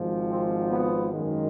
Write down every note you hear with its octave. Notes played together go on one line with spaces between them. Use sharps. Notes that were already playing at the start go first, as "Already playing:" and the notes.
Already playing: G#1 G#2 F3
C4
B3
F#2 D#3 G#3